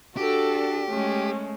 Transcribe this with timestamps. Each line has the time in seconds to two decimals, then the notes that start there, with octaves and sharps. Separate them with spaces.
0.17 D4 F#4 G4 A4
0.90 G#3 A3 C#4